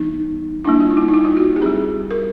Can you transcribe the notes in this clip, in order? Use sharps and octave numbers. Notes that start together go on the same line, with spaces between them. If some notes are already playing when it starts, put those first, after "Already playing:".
Already playing: E3 G3 B3 D#4
G3 A#3 D4 E4
F4
D#4
E4
D#4
E4
F4
F#4
G4
G3 C4 G#4
A#4